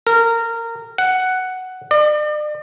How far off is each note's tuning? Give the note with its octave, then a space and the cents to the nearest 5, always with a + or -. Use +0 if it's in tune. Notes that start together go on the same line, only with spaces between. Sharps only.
A#4 -20
F#5 +5
D5 +40